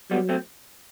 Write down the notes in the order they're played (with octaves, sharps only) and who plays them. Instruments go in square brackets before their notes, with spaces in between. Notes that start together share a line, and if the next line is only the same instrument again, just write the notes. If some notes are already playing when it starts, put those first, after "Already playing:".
[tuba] F#3 [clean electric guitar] G3 B3
[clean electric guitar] A3 C4